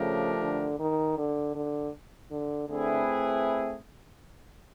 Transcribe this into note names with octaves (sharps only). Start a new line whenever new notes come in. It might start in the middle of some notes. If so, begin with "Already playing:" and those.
Already playing: C#3 F3 A3 D4 G4 A#4
D3
D#3
D3
D3
D3
D3 A3 C4 E4 G#4 B4